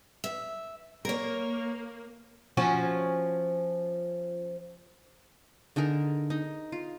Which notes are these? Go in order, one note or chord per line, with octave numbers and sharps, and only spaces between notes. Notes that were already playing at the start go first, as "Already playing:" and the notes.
E5
A#3 A#4 C#5
F3 C#4 F#4
D3 D#4 G#4 A#4
D#4
F4